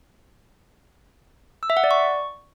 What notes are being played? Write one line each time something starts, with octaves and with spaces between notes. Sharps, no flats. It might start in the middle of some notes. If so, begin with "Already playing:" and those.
E6
E5
F#5
D5
C#6